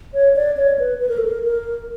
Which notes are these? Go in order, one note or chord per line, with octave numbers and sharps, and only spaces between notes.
C#5
D5
C#5
B4
B4
A#4
A4
A#4
A#4